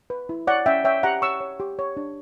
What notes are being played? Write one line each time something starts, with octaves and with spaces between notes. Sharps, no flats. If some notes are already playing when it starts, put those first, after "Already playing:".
B4
E4
C#5 D5 F#5
C#4 E5 G5
C#5 E5 G5
G4 F#5 A#5
C#5 C#6 E6
C#5
G4
C#5
D4